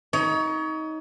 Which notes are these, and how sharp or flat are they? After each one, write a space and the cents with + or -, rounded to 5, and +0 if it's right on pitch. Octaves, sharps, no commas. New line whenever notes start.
D#4 +20 C#5 +30